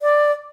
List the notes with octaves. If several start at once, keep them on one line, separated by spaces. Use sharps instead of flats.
D5